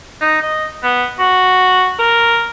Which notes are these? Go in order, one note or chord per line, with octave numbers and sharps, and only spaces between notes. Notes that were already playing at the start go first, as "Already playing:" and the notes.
D#4
D#5
B3
F#4
A#4